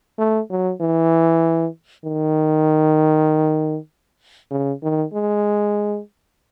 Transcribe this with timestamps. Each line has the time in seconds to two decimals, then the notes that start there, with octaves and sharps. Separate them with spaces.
0.19 A3
0.50 F#3
0.81 E3
2.05 D#3
4.51 C#3
4.83 D#3
5.13 G#3